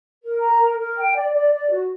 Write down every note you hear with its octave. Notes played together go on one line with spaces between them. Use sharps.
A#4
A#5
A#4
A#4
G5
D5
D5
D5
F#4